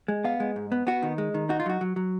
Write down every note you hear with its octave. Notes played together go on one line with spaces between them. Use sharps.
G#3
B3 F5
G#3
G#2
B3
B3 F#4
D#3
G#3
D#3
D#4 F#4
F4
F#3 F#4
F#3
F#3